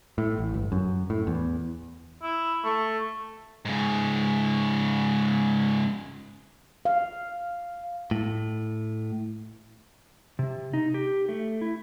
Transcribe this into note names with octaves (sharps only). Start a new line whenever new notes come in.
A2
A1
G1
F#2
A2
E2
E4
A3
G#2 C#3
F5
A2
C3
D#4
G4
A3
E4